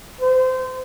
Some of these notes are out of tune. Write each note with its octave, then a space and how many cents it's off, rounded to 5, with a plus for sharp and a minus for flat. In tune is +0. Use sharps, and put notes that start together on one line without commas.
C5 -25